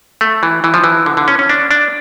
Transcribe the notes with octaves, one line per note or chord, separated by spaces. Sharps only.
A3
E3
E3
F3
E3
D3
D3
C#4
C#4
D4
D4